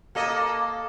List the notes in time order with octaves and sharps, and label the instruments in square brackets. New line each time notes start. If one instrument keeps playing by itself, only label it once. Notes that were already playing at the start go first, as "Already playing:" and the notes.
[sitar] A#3 A4 D#5